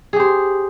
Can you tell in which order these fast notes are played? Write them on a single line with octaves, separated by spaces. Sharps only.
G#4 G4 C5